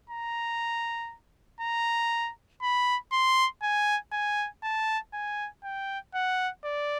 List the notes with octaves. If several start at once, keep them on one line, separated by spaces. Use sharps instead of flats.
A#5
A#5
B5
C6
G#5
G#5
A5
G#5
G5
F#5
D5